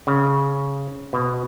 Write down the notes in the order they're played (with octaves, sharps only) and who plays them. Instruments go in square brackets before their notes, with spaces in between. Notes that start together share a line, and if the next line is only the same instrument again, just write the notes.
[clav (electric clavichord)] C#3
B2